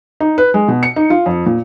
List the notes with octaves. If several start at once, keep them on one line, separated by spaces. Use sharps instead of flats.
D#4
B4
G#3
B2
C#7
D#4
F4
F2
A#2